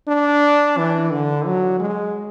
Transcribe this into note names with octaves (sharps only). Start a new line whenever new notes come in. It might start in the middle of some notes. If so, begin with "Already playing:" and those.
D4
E3
D3
F#3
G#3